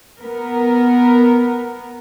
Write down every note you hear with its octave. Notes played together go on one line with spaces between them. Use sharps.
B3 A#4